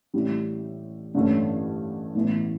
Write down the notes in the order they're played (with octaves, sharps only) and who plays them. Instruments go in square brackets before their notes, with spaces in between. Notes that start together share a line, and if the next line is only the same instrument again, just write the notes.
[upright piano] A1 A2 G3
A1 G2 D3 A3 C#4
A1 A2 E3 B3